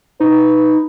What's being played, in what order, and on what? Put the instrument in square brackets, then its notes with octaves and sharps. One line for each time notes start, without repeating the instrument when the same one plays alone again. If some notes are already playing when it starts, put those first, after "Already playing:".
[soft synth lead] D#4 [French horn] B4